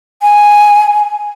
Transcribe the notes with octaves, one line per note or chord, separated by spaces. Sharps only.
G#5